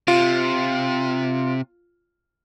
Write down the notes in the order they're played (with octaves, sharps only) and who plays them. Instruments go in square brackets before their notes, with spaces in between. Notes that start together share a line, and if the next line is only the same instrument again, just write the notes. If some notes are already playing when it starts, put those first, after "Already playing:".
[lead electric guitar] C3 [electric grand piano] F4